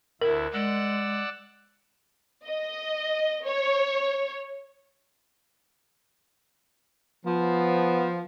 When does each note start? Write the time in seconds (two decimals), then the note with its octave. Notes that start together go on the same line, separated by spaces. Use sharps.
0.22 D2 E4 A#4
0.53 G#3 D5 F#5 E6
2.45 D#5
3.46 C#5
7.26 F3 B3